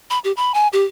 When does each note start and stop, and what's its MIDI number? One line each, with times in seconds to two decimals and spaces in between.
0.10 0.19 83
0.24 0.32 67
0.37 0.52 83
0.54 0.67 80
0.73 0.84 67